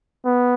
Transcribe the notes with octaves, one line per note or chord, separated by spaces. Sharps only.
B3